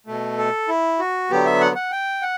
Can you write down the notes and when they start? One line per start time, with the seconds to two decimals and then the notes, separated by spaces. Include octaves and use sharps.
0.07 B2 A3
0.38 A4
0.68 E4
0.99 F#4
1.30 D3 F#3 B3 G4
1.46 E5
1.61 F#5
1.75 F#5
1.92 G5
2.22 F#5